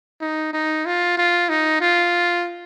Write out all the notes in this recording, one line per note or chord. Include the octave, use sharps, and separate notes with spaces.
D#4
D#4
F4
F4
D#4
F4